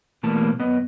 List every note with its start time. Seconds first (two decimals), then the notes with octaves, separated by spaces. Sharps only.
0.23 B2 E3 G3 A3 A#3 A5
0.59 F#2 B3 D#5